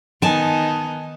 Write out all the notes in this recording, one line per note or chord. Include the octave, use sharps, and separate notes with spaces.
D#3 B3 D#4 G#5 A5